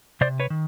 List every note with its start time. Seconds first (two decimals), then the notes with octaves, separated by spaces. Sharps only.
0.21 C3 C5 D5
0.40 B4 C#5
0.50 D#3